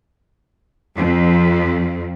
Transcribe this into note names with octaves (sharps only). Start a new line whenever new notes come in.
F2